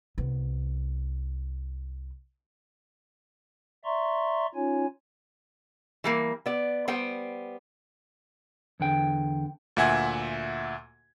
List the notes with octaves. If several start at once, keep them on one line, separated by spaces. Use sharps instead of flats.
C2 B3
D5 E5 A#5 C6 C#6
C#4 D#4 F4 C#5 G#5
E3 G3 A#3
B3 D5
G3 B3 C5 G5
E2 D3 G5
D2 A#2 E5 F#5 G#5 G#6